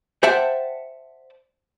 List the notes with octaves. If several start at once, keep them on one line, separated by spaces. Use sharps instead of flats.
C5 D5 E5 F#5 G5 A5